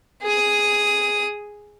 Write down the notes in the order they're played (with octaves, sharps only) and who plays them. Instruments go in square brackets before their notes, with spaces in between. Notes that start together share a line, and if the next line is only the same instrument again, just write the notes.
[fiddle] G#4 D#6